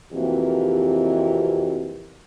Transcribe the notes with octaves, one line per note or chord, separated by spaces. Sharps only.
F2 C3 E3 A#3 F#4 G4